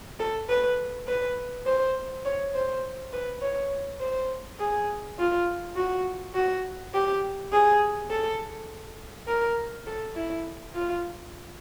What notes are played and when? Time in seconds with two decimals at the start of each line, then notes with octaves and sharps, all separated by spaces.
0.20 A4
0.49 B4
1.08 B4
1.66 C5
2.25 C#5
2.54 C5
3.13 B4
3.42 C#5
4.00 C5
4.59 G#4
5.18 F4
5.76 F#4
6.35 F#4
6.94 G4
7.52 G#4
8.10 A4
9.27 A#4
9.87 A4
10.16 E4
10.74 F4